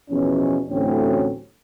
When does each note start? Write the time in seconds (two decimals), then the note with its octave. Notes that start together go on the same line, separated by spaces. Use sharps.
0.10 E2 B2 F3 C#4
0.69 A1 D2 A2 F#3 C4 C#4